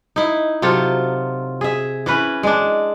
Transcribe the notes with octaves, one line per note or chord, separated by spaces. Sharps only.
D#4 E4
C3 F#3 F4 A4
G#4 E5
E3 C#4 B4
G#3 D4